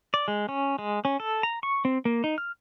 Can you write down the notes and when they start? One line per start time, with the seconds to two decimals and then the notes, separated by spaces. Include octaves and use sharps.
0.14 D5
0.28 G#3
0.49 C#4
0.79 G#3
1.05 C#4
1.20 A4
1.43 A#5
1.63 C#6
1.85 C4
2.05 A#3
2.24 D#4
2.38 F6